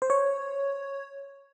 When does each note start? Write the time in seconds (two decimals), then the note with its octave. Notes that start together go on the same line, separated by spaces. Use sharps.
0.02 C5
0.10 C#5